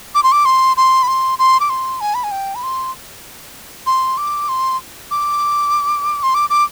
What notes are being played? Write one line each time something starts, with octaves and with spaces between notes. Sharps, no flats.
D6
C6
D6
C6
C6
B5
C6
C6
D6
C6
G#5
B5
G#5
G5
B5
C6
C6
D6
C6
D6
C6
D6
D6